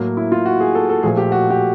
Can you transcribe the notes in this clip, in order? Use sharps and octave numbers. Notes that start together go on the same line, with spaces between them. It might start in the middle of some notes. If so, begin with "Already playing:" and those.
Already playing: A2 F#3 A#3
E4
F4
F#4
G#4
A4
A4
A#2 F3 A3 G#4
G4
F#4
G4